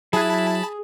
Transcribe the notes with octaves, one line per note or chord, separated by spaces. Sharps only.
F#3 E4 G#4 A5 B5 F#6